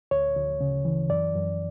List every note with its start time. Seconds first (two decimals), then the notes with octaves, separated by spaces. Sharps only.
0.11 D2 C#5
0.36 D2
0.61 C#3
0.85 E3
1.09 F#2 D5
1.35 F#2